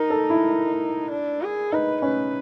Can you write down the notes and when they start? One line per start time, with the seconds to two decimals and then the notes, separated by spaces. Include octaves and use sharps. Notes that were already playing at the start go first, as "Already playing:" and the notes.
Already playing: D#4 A#4
0.10 A4
0.30 E4
1.11 D4
1.42 G#4
1.72 D#4 B4
2.02 C#4 B4